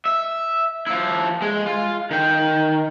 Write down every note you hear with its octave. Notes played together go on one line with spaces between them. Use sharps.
E5
F3 E4
G#3
F4
D#3 G5